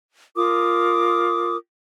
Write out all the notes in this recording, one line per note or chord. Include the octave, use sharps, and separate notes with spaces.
F4 A#4 D6 D#6